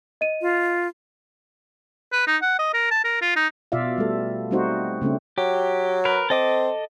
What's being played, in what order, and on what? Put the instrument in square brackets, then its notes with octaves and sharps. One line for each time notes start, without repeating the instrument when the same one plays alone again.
[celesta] D#5 D#7
[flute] F4
[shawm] B4
D#4
F#5
D#5
A#4
A5
A#4
F4
D#4
[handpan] B2 F4 D5 E5 F5
G3 A3 A4
G3 A3 C4 D#4 F#4 C5
C#3 A3 C4 D4
[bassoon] F#3 [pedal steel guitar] G4
[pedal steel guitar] A#4 B4
[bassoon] C4 [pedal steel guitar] A4 D#5 D6